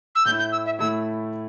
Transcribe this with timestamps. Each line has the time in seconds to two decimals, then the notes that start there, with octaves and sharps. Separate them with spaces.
0.15 E6
0.25 A2 A3 E4 G6
0.39 G6
0.52 E6
0.65 E5
0.79 A2 A3 E4 E6